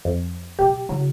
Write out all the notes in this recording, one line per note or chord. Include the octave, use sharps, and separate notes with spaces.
F2
B2 F#3 G4
C#3 F#3 E4